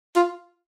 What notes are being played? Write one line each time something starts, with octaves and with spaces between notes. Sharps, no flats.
F4